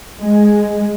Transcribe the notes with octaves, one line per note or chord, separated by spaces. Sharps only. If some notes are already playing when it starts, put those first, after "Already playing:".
G#3